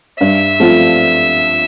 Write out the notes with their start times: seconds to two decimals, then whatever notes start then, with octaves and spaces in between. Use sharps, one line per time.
0.20 G2 E5
0.60 F3 A3 C4 F4